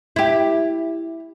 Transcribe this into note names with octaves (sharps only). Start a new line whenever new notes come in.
E4 G4